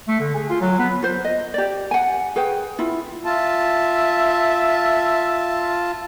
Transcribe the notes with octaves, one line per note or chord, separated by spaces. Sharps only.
A3
D3
G#4
F4
F#3
B3
F4 C5
D#5
G4 D5
F#5 G#5
G#4 B4 C#5 G5
E4 F4
F4 E5 A5